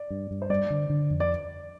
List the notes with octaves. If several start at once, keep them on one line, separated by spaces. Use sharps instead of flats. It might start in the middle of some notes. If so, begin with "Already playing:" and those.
Already playing: D5
G2
G2
C5
G3 D5
D3
D3
F2
D5